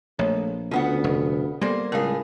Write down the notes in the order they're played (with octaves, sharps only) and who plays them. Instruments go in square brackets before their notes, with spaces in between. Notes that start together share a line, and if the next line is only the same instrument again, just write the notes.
[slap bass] A#1 [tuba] A3 [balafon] C#5
[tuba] D2 [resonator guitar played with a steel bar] C#3 B3 F#5 [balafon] C#4 F4
[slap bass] F1
[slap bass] G3 [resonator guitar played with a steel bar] A#3 C5 [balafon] B3 A4 D5
[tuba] C#2 [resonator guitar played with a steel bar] A2 G#4 [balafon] A#4 F5